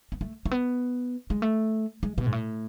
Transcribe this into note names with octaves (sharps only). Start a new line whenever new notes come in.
B3
A3
A3
B3
G#3
A3
G#3
B2
G#2
A2